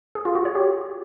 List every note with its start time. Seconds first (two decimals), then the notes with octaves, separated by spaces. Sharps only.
0.15 G#4
0.25 F4
0.35 F#4
0.45 C#5
0.55 G4